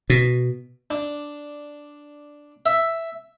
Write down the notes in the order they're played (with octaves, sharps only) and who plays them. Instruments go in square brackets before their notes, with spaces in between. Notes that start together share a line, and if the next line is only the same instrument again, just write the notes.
[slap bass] B2
[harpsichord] D4
E5